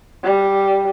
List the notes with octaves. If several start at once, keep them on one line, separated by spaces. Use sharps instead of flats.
G3